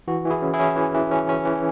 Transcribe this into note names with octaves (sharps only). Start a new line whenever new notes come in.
E3 F#4
E3
E4 G#4
C#4
E4 G#4
C#4
E3
E3
C#4
C#4
E3